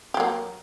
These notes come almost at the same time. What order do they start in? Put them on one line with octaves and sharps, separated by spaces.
G4 F#3 A#3